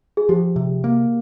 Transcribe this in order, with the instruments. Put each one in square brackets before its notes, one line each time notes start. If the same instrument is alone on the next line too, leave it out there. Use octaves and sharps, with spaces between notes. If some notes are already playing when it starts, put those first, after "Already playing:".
[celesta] G#4
[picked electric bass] F3 [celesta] G4
[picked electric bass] C3
A#3